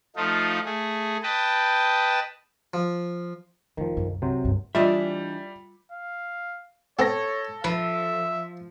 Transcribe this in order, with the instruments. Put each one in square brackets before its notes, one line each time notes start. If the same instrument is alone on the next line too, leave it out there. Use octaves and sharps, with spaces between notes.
[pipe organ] F3 A3 D#4 F4
A3 G#4
B4 D#5 G5 A5
[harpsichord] F3
[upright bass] F1 [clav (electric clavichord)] D#3 F3
[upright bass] C2 F#2
[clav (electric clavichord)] C3 F#3 C5
[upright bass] C#2 G2
[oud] E3 D4 D#5 [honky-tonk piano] G3 [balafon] F4 [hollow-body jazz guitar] E5
[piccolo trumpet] F5
[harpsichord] B3 C4 [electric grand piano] A4 A#6 [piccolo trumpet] C#5
[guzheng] F3 [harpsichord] B4 [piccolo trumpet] E5